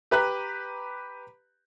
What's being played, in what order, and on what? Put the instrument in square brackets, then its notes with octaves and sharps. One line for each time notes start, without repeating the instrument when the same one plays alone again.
[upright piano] G4 B4 A#5 F#6